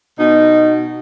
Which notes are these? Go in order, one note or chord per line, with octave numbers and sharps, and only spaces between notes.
B2 D#4